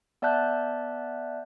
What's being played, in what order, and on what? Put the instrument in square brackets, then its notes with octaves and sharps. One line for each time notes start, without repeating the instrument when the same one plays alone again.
[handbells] B3 D5 E5 A5 F#6 G6